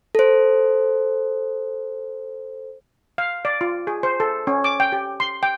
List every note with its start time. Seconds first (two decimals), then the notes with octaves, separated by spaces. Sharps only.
0.15 A4 C5
3.18 F5
3.45 D5
3.61 F4
3.87 G#4
4.03 C5
4.20 A4
4.47 C#4
4.64 D6
4.80 G5
4.92 G4
5.20 C6
5.43 G5